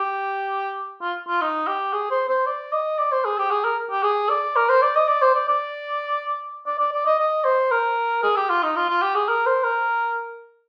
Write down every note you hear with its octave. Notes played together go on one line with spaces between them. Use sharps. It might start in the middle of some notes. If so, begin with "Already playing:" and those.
Already playing: G4
F4
F4
D#4
G4
G#4
C5
C5
D5
D#5
D5
C5
G#4
G4
G#4
A#4
G4
G#4
D5
A#4
C5
D5
D#5
D5
C5
D5
D5
D5
D5
D5
D#5
D#5
C5
A#4
G#4
G4
F4
D#4
F4
F4
G4
G#4
A#4
C5
A#4